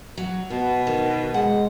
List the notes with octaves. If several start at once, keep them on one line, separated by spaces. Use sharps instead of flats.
F#3
B2 B3
D#3
G#3 F#5